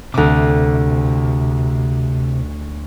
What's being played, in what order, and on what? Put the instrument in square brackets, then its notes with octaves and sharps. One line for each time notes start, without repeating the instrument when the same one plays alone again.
[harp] D2 D6 [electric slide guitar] C3